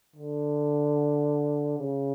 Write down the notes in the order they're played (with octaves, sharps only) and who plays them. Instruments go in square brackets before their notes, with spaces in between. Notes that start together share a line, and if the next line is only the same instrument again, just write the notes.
[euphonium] D3
C#3